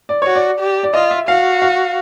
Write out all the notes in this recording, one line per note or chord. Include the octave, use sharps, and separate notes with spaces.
D5
F#4 C#5
D5
G4
D5
F4 D#5
E5
F#4 F5
F5